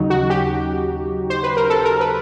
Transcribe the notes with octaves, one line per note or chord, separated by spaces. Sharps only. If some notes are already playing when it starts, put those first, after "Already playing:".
Already playing: D#2 C#3 F#3 D#4
F#4
G4
C5
B4
A#4
A4
A#4
B4